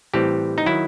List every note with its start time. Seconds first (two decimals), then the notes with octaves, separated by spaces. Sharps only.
0.14 A2 E3 G3 C4 G4
0.58 D#4
0.66 D#3 F#3 E4